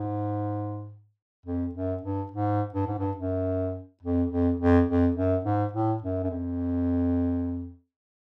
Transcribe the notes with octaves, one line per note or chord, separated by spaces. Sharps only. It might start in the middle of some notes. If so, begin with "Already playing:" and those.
Already playing: G#2
F2
F#2
G2
G#2
G2
G#2
G2
F#2
F2
F2
F2
F2
F#2
G#2
A2
F#2
F#2
F2